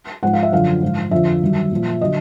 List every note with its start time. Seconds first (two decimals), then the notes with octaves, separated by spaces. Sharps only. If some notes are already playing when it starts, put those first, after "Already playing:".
0.23 G#2 F3 F#5
0.33 F5
0.43 E5
0.52 F#2 D3 F3 F5
0.82 G#2 F3
1.11 F2 D3 F3 E5
1.42 G2 D#3 F#3
1.72 A#2 F3
2.01 D3 F#3 D#5